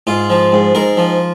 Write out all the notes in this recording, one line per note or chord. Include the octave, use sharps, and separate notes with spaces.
G#2 F4
F3
G#2
G#2 A#4
F3